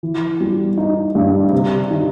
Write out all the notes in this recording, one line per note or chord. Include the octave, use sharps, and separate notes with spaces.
E3
G3
D#4
G2
C3
D#3